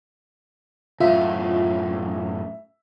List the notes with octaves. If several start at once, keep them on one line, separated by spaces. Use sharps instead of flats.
F#2 A2 C#3 F4 E5